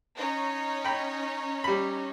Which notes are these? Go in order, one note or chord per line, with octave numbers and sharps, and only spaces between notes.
C#4 D#4 C#5
G5 B5
G3 B5